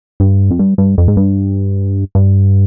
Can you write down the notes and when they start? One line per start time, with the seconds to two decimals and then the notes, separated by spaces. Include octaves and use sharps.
0.20 G2
0.51 F2
0.59 G2
0.78 G2
0.98 F2
1.08 G#2
1.17 G2
2.15 G2